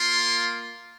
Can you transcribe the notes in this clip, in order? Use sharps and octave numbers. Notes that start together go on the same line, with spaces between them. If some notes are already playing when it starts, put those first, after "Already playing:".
Already playing: A#3 F4 C6